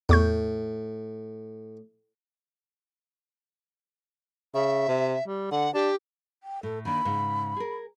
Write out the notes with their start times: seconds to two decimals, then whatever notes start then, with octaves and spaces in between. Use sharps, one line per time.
0.09 E2 A2 C#6 G6
4.54 C#3 E5
4.88 C3
5.27 G3
5.51 D3 F#5
5.74 D4 G4
6.43 G5
6.63 A2 A4
6.85 D#3 A#3 D4 B5
7.05 G#2 C#3
7.56 G#4 A#4